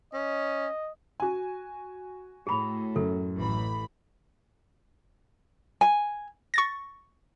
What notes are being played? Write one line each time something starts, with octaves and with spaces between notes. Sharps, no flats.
C#4 D#5
F#4 G#5
A2 G#4 B5
F#2 A4
A1 E3 B5
G#5
C#6 A6 A#6